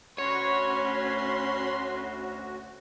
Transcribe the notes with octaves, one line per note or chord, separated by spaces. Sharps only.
D2 C#4 F#4 C#5 B5 C6